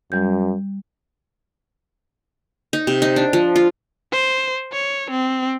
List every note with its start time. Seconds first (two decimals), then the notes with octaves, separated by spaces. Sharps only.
0.12 F#2 G3 G6
2.73 D#4
2.87 C3
3.02 D#4
3.16 D4
3.33 F3
3.56 F4
4.12 C5
4.73 C#5
5.11 C4